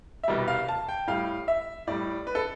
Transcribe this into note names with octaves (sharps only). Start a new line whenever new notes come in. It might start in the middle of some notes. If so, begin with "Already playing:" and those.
E5
C2 B2 G3 D5
F5
A5
G5
A2 G3 F5
E5
A2 G3 D5
B4
A4